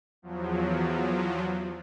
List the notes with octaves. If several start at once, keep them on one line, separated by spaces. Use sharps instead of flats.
E2 F3 F#3